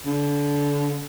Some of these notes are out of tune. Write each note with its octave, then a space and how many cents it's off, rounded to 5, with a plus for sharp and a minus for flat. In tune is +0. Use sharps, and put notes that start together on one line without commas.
D3 -30